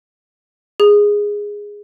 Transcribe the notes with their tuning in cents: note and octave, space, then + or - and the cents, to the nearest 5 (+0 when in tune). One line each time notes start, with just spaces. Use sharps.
G#4 -10